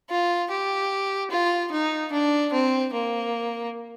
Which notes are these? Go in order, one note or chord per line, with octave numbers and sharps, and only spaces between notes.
F4
G4
F4
D#4
D4
C4
A#3